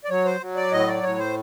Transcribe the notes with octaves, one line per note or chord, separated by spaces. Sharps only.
D5
F#3 C#5
C5
F#3
D5
A2 D#5
D5
A2 C#5
C5